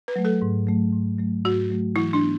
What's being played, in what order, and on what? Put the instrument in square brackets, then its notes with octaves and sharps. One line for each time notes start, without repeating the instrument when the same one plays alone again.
[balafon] B4
[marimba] F#3 A3
[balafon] A4
[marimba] G#2
F#3 A3
G#2
F#3 A3
[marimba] G#2 [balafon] F#4
[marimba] F#3 A3
[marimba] E3 [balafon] E4
[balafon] D4
[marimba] B3